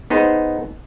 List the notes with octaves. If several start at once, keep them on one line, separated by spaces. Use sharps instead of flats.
B3 D#4 G#4 C5